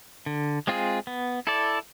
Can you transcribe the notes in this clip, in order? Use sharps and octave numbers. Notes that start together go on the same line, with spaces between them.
D3
G#3 C4 F4 G#4
B3
E4 A4 D5